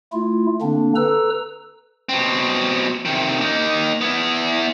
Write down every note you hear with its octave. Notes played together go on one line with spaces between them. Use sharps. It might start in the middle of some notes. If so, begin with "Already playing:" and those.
A3 E4 F4
D3 A#3 C4 D4
A4 B4 A#5 E6
B2 C4
C3 D#3
A#3 D#4
B3 E4